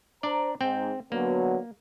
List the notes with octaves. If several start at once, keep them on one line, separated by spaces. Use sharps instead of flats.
D4 C5 D5 A#5
G#2 C4 G5
D3 F#3 A#3 B3